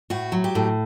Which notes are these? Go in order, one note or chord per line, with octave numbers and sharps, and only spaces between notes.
A2 F#4
F#3
G4
A2